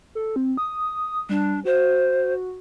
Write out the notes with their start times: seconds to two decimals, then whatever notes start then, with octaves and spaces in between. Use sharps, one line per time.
0.15 A4
0.36 C4
0.57 D#6
1.29 G3 D4
1.65 F#4 C5